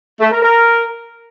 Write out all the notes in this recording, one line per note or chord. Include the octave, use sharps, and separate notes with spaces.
A3
A#4
A#4